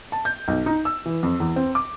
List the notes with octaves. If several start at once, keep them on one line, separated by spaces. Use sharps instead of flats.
A5
G6
B1
D#4
E6
E3
F2
E2
C4
D6